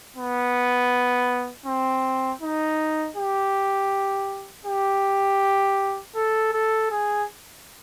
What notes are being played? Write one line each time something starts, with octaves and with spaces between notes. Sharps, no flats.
B3
C4
D#4
G4
G4
A4
A4
G#4